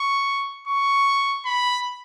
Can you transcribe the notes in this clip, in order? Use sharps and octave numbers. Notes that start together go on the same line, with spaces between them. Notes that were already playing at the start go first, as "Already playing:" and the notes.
Already playing: C#6
C#6
B5